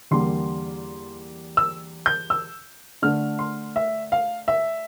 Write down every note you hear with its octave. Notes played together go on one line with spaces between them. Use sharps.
E2 D3 G3 A#3 C6
E6
G6
E6
D3 A3 D4 F6
C6
E5
F5
E5